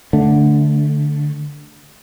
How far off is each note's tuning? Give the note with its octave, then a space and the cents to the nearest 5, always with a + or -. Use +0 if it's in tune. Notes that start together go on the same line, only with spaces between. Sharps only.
D3 +0 A3 +0